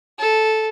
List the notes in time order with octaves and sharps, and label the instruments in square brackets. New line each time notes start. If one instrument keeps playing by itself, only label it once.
[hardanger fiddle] A4